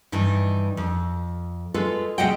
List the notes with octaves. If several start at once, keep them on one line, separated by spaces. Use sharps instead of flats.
G2 D#3 E3
F2
G#3 F4 A4 B4
D#2 C3 G#3 D#5 F#5 G5